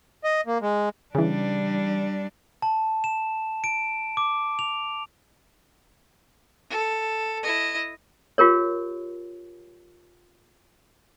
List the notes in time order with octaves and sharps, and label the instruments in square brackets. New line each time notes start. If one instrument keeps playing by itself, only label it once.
[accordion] D#5
A#3
G#3
[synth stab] C#3 E3 [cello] G3 D4
[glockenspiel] A5
E7
D7
D6
F7
[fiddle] A4
E4 D#5
[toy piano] F4 G4 A#4 C#5